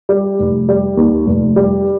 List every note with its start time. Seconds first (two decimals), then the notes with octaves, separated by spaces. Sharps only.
0.09 G3
0.39 F1
0.69 G3
0.97 D#2
1.26 F1
1.56 G3